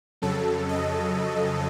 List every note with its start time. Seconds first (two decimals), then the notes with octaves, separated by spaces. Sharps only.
0.22 F2 C#3 F#3 A4
0.69 D#5